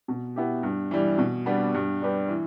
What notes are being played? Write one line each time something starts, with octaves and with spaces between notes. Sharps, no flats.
B2
B3 E4 G4
G2
E3 G3
B2
G3 B3 D4
G2
G3 D4 G4 B4
E3